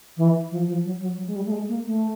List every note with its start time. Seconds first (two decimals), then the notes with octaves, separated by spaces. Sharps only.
0.17 E3
0.51 F3
0.67 F3
0.85 F#3
1.01 F#3
1.18 F#3
1.27 G#3
1.36 G3
1.46 A3
1.51 G#3
1.68 A#3
1.86 A3